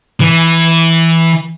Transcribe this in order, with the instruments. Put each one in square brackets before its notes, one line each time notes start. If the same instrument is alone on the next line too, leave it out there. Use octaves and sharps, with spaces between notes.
[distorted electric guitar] E3